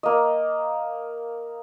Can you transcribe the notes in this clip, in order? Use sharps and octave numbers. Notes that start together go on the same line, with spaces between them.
A#3 D#5